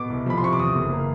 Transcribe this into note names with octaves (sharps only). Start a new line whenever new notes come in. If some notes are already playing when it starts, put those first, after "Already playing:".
Already playing: B2 D6
C2
F3 B5
C6
C3 C#6
D6
E2 D#6
F#1
A#3